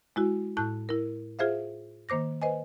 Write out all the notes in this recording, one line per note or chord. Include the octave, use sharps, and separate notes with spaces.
G#3 E4 F#4
A2 E4 A5 F#6 G6
E4 A#4
F4 G#4 C5 E5 F5
D#3 A#3 C5 D6 A#6
B4 C5 D#5 G#5